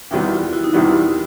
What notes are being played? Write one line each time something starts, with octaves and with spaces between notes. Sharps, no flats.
E2 C3 D#3 G3 B3 E4
F4
E4 F#4
D#4
E2 C3 D#3 G3 B3 E4
D#4